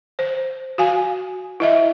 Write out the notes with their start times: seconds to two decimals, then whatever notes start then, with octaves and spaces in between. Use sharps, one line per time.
0.19 C5
0.78 F#4 F5 G#5
1.60 E4 D#5 E5